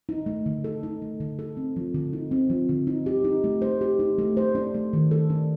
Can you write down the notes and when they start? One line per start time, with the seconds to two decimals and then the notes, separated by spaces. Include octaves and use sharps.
0.09 D#4
0.26 A3
0.46 D3
0.64 A4
0.83 D#4
1.02 A3
1.20 D3
1.39 A4
1.57 C4
1.76 F3
1.94 D3
2.13 D#4
2.31 C4
2.50 F3
2.69 D3
2.87 D#4
3.06 G4
3.24 D#4
3.44 A3
3.62 C5
3.81 G4
3.99 D#4
4.18 A3
4.37 C5
4.55 D4
4.74 A3
4.93 D#3
5.11 A4
5.30 D4